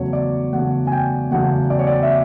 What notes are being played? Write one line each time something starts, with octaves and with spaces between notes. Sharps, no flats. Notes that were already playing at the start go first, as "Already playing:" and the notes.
Already playing: E2 C#3 F#3 A3 C#5
D5
E2 C#3 F#3 A3 F#5
G#5
G5
E2 C#3 F#3 A3 F#5
D5
C#5
D5
E5